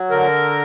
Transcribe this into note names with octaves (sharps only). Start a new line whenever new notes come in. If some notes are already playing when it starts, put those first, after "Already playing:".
Already playing: F#3
D3 A#4